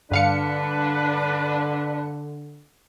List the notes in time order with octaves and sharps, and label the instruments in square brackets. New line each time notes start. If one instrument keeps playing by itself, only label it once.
[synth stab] G2 F5 C#7 [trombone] D3 [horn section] D4 B4